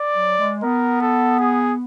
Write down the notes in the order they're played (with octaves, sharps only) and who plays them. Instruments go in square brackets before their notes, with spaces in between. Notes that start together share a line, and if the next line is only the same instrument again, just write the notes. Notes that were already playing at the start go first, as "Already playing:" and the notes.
Already playing: [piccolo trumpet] D5
[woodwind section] F#3
G#3
[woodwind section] B3 [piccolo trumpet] A#4
[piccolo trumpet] A4
G#4